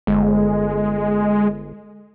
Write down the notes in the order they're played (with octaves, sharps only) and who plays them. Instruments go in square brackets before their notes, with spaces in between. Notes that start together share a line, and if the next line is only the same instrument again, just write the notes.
[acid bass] G1 [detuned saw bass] G#3